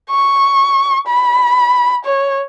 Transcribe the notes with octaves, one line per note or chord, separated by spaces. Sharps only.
C#6
B5
C#5